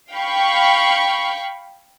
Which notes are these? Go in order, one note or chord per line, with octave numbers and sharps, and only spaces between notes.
F5 G5 B5 C#6